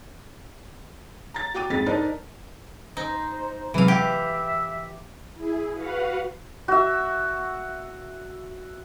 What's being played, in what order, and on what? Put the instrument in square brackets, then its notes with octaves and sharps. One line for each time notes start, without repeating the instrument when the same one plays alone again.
[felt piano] A#5 A6
F#4 G5 D6 D#7
F2 G#2 A6 B6
D4 D#4 A#4 C5
[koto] D#4 [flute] C5
[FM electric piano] C3 F#3 G#3 [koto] E3 F5
[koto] G4 [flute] E5 [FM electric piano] G5
[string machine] E4 G#4
F#4 B4 F5 F#5
[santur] F#4 E5